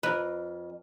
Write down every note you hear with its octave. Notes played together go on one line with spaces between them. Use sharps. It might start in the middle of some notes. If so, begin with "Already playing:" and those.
F2 A#4 B4